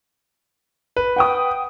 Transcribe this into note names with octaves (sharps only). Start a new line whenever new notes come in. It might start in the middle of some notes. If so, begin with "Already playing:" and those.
B4
F#5 G5 D#6